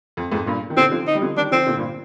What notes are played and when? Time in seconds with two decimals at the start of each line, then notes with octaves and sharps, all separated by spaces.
0.17 F2
0.32 F2 G#2
0.46 G2 A#2
0.70 D#3
0.76 A#2 D3 C4
0.91 D3 F3
1.07 D#4
1.15 G3
1.22 D3 F3
1.36 D#3 G3 D4
1.51 D3 F3 C4
1.67 A#2 D3
1.77 G2 A#2